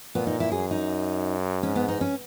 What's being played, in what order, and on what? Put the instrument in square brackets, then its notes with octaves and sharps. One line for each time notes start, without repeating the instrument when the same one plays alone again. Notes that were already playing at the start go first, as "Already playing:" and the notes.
[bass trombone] A#2 [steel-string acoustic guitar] B3
[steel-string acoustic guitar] D#4
E4
[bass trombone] F#2 [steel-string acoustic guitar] G#4
[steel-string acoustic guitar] D#4
[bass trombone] G#2 [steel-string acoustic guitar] C#4
[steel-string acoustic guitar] B3
D#4
C#4